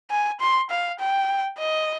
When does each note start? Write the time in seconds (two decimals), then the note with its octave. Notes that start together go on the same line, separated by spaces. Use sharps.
0.11 G#5
0.40 C6
0.70 F5
0.99 G5
1.59 D#5